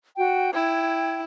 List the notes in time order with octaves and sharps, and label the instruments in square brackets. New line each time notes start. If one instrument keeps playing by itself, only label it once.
[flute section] F#4 G5
[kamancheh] E4 [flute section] G5 G#6